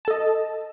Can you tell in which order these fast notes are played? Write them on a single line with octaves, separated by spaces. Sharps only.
A5 A4 D#5